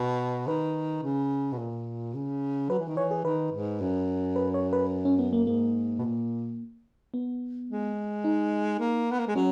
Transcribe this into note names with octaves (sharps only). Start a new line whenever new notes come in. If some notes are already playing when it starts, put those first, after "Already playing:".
Already playing: B2
D#3 B4
C#3
B2
A#2
C#3
F#3 B4
E3
D#3
E3 C#5
G#4
D#3 B4
G#2
F#2
B4
C#5
B4
C#4
B3
A#3
G#2 A#3
B2
A#2
B3
G#3
D#4
A#3
B3
A#3
G#3
F#3 C#4